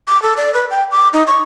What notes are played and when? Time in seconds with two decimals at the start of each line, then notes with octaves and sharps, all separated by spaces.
0.08 D6
0.22 A4
0.37 D5
0.54 B4
0.70 G5
0.91 D6
1.13 D#4
1.27 C#6